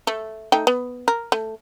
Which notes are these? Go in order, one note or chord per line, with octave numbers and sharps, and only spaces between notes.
A3
A3 D#4 G5
B3
A#4
A3